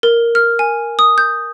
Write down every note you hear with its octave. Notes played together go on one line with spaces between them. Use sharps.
A#4
F6
G#5
D#6
G6